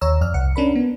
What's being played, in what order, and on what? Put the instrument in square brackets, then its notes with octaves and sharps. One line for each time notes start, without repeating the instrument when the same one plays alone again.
[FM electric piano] D#2 C#5 A#5 E6
F2 D5 F6
C2 F#5 C#7
C#4 D4 A#4 B5
B3